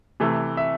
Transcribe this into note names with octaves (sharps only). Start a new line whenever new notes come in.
C3 E3 A3
E5